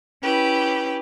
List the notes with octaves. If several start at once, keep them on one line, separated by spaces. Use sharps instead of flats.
C#4 E4 G4 B4